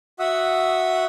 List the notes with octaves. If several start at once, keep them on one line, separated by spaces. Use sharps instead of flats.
F#4 E5 F#5 D#6 E6